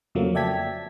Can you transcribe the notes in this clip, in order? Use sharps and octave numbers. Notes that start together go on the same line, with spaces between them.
F2 C#3 F3 F#3 A3 A#3
D5 E5 G5 A5 G#6 B6